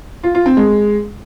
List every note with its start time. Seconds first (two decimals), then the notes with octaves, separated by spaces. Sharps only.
0.24 F4
0.35 F4
0.46 C4
0.57 G#3